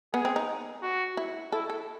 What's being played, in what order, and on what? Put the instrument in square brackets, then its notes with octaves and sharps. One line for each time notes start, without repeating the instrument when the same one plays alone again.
[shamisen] B3 [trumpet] G#4
[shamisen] C4
D#4
[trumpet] F#4
[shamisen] E4
[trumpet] E4 [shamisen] A4
[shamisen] A4